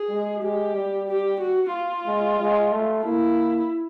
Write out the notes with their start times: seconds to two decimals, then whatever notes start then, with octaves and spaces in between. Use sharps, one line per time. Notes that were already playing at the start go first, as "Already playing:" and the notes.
Already playing: G#4
0.09 G#3
0.42 G#3 G4
0.75 G3
1.08 G4
1.40 F#4
1.73 F4
2.06 G#3
2.40 G#3
2.72 A3
3.05 A#3 E4